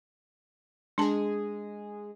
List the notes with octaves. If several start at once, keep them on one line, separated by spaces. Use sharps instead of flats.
G#3 D4 G#4 A5